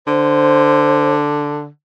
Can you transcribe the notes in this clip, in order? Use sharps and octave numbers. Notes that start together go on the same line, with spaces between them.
D3 C5